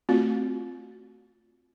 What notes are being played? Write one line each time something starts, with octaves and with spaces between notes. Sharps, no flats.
A3 C4 F4 F#4